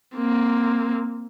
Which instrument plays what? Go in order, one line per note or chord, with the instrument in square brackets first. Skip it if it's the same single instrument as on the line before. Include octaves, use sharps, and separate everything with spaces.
[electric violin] A#3 C4